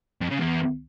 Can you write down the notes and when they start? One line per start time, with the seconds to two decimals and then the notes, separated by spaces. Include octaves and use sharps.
0.21 F2
0.30 C#3
0.39 E2